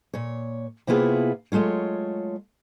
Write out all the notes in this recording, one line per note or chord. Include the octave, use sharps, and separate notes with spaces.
A#2 C#5
C3 A#3 B3 E4 F4 G#4
F#3 G#3 A3 F4 C#5